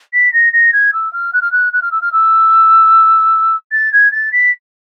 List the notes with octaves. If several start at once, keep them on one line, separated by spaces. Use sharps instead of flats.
B6
A#6
A#6
G#6
E6
F6
F#6
F6
F#6
F#6
F6
E6
F6
E6
A6
G#6
A6
B6